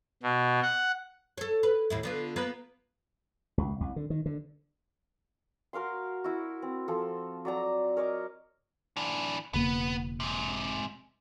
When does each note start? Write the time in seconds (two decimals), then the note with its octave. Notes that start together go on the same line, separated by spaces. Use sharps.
0.23 B2
0.62 F#5
1.38 A4 C#5
1.63 B4
1.90 D#2 A2 E4
2.03 D3 B3 F4
2.36 A#3 B3 B4
3.58 C#2
3.80 C2
3.96 D3
4.10 D#3
4.26 D3
5.73 F#4 A#4 F5 C6
6.24 E4 F#4
6.62 C4
6.88 F3 A4
7.45 F#3 D5 A#5
7.97 A#4 C#5 D#5 D6
8.97 E3 D4
9.54 E1 C#3 A#3 B3
10.20 G#2 C3